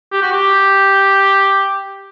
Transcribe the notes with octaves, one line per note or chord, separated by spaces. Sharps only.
G4
F#4
G4